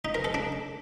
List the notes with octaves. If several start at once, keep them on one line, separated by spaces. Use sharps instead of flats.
D#4
A#4
A4
D4